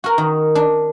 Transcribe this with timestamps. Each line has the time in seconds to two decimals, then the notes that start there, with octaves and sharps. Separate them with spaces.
0.04 F#4 A#4
0.18 D#3
0.55 D4